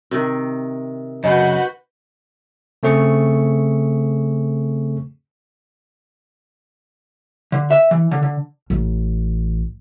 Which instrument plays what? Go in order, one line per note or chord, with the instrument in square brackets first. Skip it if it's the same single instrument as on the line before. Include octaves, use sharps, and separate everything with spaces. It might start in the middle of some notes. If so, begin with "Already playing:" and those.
[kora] C3 D#3
[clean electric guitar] F#2 C#3 [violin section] F#4 B4 G6 [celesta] D#5
[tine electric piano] C#3 A3 C4 G#4 C#6
[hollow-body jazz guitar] D3
E5
E3
D3
D3
[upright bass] A1